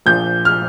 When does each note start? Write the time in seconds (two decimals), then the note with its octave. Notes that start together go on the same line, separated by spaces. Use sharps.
0.06 A#1 A#2 F3 G6
0.45 F6